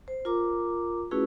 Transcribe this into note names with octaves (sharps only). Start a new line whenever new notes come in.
C5
F4 A#4 A#5 D6
A3 C#4 E4 F#4 G#4 B4